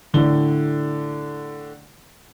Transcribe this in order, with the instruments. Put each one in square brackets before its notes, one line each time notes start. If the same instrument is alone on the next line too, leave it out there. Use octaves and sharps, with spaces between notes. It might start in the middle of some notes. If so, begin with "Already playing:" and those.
[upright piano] A2 D3 G7